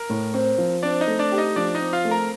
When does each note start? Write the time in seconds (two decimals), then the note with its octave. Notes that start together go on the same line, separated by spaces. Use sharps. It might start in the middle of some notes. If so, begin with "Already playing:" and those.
Already playing: A#4
0.10 A2
0.34 C4
0.58 F3
0.83 C4 D4 D5
1.01 D#4 D#5
1.07 A3
1.19 D4 D5
1.32 G4
1.38 D#4 D#5
1.56 F3 D4 D5
1.75 D#4 D#5
1.81 C4
1.93 F4 F5
2.05 A3
2.11 A#4 A#5